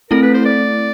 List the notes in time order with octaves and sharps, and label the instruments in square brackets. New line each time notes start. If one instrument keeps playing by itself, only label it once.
[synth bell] A3 C4 E4 A4 [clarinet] A#4
[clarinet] B4
C5
D5